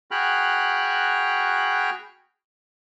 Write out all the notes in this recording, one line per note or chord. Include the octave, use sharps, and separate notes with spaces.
F#4 G#4 G5 B5 F6 F#6